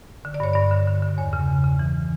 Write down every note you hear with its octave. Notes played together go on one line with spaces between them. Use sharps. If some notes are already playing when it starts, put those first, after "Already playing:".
D3
D5
G2 C#5
G2 D5
D3
D3
D3
E2 C#5
C#3
E2
C#3
E3